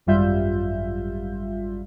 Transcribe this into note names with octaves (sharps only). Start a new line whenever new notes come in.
G#1 F#2 G3 F4 E5 G6